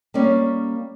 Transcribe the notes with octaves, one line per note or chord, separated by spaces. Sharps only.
G3 A#3 C#4 D5